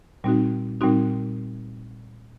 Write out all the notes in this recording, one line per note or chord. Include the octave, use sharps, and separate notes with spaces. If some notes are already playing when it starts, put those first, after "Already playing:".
A#2 G3 C4 D#4 F#4
A#2 G3 C4 D#4 F#4